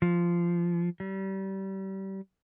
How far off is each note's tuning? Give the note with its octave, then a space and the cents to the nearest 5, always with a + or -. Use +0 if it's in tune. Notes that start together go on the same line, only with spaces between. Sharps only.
F3 -15
G3 -30